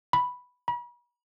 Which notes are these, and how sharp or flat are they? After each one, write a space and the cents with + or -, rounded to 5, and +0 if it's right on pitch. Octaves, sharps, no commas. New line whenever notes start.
B5 +0
B5 -40